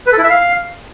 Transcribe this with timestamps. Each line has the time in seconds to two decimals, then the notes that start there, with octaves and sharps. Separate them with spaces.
0.07 B4
0.12 A4
0.18 E4
0.24 E5
0.30 F5